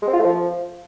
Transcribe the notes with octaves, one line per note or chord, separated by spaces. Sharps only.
G#3
C4
F4
A3
F3